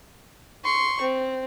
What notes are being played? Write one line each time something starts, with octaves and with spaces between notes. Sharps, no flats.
C6 C#6
C4